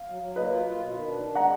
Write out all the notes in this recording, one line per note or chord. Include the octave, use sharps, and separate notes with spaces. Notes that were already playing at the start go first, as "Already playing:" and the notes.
Already playing: F5
F#3
F#3
A#3 B4 D#5
F4
F4
B2
D#3
D4
D4
G#3 F#5 A#5